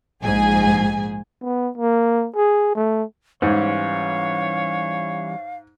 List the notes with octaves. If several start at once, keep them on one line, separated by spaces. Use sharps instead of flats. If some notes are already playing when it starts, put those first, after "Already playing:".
A#1 G#2 G#4 G#5
B3
A#3
G#4
A3
G#2 E3 G3 C#4 C#5 F5